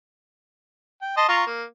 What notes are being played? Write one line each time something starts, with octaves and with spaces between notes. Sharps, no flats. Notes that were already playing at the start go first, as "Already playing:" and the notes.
G5
D#5 A5 C6
F4 A#5 C#6
A#3